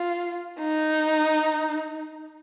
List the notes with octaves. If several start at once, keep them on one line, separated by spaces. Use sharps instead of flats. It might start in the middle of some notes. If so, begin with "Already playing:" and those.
Already playing: F4
D#4